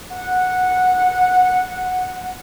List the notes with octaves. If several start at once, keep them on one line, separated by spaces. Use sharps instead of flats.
F#5